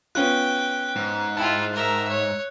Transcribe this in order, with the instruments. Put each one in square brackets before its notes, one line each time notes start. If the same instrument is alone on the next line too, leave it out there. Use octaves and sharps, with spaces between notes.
[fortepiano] B3 C#4 F4 [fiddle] G5 [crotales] F#6
[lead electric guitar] G#2
[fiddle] E4 F4 [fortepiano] G5 A5
[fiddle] A#4 E5
C#5